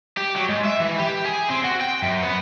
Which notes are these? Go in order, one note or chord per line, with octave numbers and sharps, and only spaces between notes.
G4
F#3
G#2
E5
E3
G4
G#4
C4
F#4
G5
F#2
B3